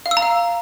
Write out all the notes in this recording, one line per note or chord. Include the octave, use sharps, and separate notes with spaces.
F5
E6
A#5
F5